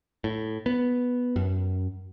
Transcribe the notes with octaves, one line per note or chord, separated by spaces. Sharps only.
A2
B3
F#2